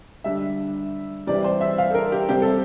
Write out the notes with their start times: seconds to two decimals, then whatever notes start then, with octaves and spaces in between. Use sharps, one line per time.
0.24 D3 G3 D4 E5
1.27 C3 E3 G3 D5
1.44 C5
1.61 E5
1.78 F5
1.91 A4
1.95 A#4
2.12 G4
2.29 C3 G3 C4 G4
2.42 A4